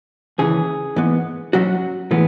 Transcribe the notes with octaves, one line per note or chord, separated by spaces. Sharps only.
D#2 C#3 E3 G#4
G#2 E3 B3
G#2 F#3 C#4 F#4
A2 E3 G#3 B3